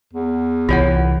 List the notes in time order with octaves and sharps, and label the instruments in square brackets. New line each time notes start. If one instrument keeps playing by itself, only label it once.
[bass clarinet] E2
[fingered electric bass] C2 E3 [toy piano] F4 C#5 F#5